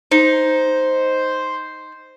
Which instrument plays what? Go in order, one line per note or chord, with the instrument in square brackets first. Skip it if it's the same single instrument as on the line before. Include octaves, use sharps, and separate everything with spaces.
[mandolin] D#4 [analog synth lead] C5